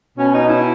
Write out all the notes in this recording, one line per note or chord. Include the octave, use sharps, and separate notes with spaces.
B2 C#4
D#4
E4